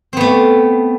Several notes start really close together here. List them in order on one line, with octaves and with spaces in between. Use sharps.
C4 B3 A3